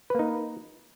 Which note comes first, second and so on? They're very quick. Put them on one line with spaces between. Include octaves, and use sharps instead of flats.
B4 A#3 D#4